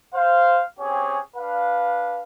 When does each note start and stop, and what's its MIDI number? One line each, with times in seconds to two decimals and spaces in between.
0.15 0.62 72
0.15 0.62 77
0.79 1.18 60
0.79 1.18 61
0.79 1.18 67
0.79 1.18 68
0.79 1.18 73
1.36 2.21 62
1.36 2.21 71
1.36 2.21 77